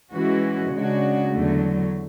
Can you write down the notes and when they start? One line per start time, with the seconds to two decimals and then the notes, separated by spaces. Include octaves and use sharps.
0.13 E3 G#3 C#4 F#4
0.73 C#3 G#3 D4 F#4
1.32 E2 D3 F#3 A3